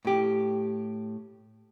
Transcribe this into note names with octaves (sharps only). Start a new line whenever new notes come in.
A2 G4